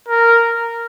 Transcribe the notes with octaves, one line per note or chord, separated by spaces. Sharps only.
A#4